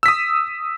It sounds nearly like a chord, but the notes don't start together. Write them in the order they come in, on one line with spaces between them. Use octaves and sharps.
E6 B6 D#6